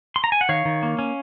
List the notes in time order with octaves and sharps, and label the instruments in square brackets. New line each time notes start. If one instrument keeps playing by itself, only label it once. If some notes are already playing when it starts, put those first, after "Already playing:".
[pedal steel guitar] C6
A#5
G#5
F#5
D#3 C#5 F5
D#3
A#3
C#4